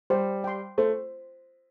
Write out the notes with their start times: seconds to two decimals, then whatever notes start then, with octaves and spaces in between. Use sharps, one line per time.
0.10 G3 C5
0.44 G5 C6
0.78 A3 C5